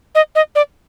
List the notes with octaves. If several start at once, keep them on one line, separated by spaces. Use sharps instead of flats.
D#5
D#5
D5